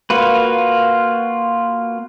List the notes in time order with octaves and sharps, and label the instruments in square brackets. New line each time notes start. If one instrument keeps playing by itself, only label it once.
[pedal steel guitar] A#3 F4 F#4 B4